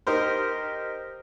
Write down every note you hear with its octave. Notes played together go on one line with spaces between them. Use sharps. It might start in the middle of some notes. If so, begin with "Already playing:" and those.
D#4 G4 A#4 C5